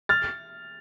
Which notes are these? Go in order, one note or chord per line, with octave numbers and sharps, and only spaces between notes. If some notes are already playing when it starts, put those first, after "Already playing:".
F6 A6